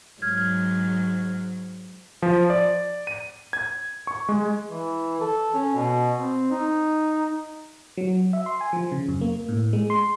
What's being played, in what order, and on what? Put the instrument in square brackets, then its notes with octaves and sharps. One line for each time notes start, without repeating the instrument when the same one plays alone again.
[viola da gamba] G#2 F#3 [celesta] F6 G#6
[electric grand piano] F3
D5
D#7
G#6
C#6
G#3
[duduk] E3
A4
C#4
B2
C4
D#4
[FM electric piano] F#3
E5
C6
G#5
F3
C#3
F#2
A#3
A2
G#3
C6